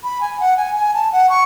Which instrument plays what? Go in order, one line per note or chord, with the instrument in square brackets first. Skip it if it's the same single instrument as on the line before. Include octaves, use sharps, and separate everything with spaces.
[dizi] B5
G#5
F#5
G#5
G#5
A5
F#5
C#6